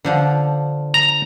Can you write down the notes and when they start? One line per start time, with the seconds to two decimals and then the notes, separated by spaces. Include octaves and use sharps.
0.04 D3 F3 D4
0.94 A#5